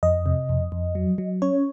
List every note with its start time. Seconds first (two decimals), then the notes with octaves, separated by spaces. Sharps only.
0.03 F2 D#5
0.26 C3
0.49 F2
0.72 F2
0.95 F#3
1.18 F#3
1.42 C#4 C#5